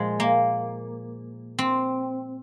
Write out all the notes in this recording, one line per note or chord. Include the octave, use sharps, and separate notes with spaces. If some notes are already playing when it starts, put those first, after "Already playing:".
Already playing: A#2 F3 G#3
A#3
C4